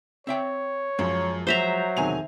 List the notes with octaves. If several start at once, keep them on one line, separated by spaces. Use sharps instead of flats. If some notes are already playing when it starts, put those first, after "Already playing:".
C4 C#5 E5 G5
F#2 F3 G#3
F#3 C5 E5 A#5 G6
B1 E2 C3 D#3 G#5 F7